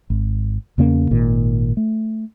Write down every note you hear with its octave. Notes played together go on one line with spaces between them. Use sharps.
G#1
E2 C#3 A#3 C#4
G#1 A#2 D#3
A3